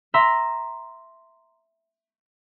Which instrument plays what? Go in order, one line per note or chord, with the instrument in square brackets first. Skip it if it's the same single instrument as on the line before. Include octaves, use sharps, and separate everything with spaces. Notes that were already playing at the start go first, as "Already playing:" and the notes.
[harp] E5 A#5 C6 E6